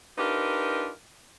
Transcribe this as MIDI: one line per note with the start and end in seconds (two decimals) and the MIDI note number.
0.18 0.89 62
0.18 0.89 63
0.18 0.89 65
0.18 0.89 67
0.18 0.89 70
0.18 0.89 71